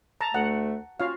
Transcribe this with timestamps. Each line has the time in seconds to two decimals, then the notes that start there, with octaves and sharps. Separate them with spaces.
0.21 A5 A#5
0.34 D2 A3 F#5
1.00 C#4 F4 F#4 F5